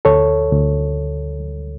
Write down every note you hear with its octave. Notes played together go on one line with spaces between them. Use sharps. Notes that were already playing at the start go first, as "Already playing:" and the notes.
D2 A4 C#5
D2